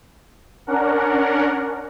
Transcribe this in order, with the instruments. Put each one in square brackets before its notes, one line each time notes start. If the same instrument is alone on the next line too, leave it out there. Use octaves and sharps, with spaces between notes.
[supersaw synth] C#4 D4 A#4 F#5